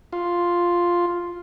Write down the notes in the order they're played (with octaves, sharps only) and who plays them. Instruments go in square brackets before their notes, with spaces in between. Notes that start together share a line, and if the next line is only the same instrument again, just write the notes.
[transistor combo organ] F4